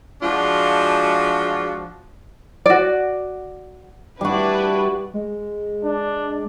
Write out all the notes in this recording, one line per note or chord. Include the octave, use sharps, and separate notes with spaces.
F3 G#3 D4 F4 F#4
F#4 D5
G3 D4 E4 F#4 B4
G#3
D4